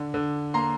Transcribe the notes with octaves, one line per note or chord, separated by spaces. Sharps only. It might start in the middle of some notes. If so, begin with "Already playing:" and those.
Already playing: D3
D3
A#3 A#5 C6